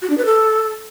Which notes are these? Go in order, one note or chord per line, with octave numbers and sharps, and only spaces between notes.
F#4
D4
B4
A4